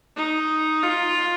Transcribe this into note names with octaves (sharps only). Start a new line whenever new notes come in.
D#4
F4